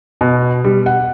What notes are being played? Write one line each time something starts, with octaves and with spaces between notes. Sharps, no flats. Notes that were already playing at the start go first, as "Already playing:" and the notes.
B2
G3
F#5